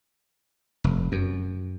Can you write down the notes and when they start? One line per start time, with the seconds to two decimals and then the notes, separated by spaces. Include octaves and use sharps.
0.84 F1
1.12 F#2